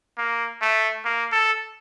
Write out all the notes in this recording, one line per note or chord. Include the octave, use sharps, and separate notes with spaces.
A#3
A3
A#3
A4